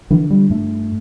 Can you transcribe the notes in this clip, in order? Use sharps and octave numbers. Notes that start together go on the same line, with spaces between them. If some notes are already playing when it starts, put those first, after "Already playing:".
D3 E3
G3
G2 A3